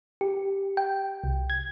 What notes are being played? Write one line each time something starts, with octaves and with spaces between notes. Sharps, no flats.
G4
G5
C2
G#6